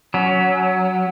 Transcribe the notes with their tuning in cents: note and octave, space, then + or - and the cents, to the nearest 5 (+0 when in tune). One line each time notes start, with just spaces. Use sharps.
F#3 +0 C#4 +20